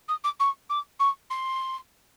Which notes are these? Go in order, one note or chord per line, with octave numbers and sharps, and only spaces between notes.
D#6
D6
C#6
D6
C#6
C6